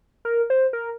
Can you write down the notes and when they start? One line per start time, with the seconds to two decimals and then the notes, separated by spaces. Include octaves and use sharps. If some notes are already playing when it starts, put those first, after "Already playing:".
0.25 A#4
0.50 C5
0.73 A#4